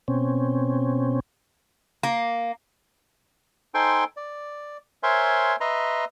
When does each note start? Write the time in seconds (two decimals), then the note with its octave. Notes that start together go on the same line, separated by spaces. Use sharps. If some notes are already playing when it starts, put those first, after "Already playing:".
0.08 B2 C4 C#4
2.03 A#3
3.74 D#4 A4 C5 G5 G#5 C6
4.17 D5
5.03 A#4 C5 C#5 E5 G#5 C6
5.61 B4 D#5 E5 A#5 C6